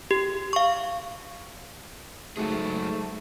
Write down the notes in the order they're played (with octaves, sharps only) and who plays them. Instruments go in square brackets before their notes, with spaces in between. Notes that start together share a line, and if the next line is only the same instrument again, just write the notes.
[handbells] G4
F5 C#6
[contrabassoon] G#2 [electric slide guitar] F#3 F#4 G#4 [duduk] A3